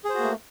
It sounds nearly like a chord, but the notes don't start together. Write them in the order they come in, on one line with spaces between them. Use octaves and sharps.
G#4 C5 F#4 A#3 A3